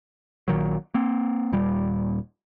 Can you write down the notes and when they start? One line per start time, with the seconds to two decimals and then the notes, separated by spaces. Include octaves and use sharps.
0.48 A#1 A#2 D#3 F#3
0.94 A#3 C4
1.52 D#1 A#2 G3